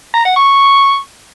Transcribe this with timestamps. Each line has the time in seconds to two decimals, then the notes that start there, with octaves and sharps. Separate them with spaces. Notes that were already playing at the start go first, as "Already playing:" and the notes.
0.14 A#5
0.25 F#5
0.36 C#6